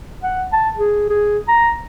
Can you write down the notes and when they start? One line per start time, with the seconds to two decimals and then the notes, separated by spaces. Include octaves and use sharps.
0.24 F#5
0.53 A5
0.77 G#4
1.10 G#4
1.48 A#5